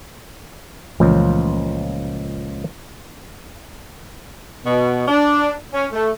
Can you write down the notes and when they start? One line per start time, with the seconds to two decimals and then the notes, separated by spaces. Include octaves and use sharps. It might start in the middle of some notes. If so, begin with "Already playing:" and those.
1.00 C#2 A#2 E3 F3 A3
4.65 B2
5.08 D4
5.72 C#4
5.92 A3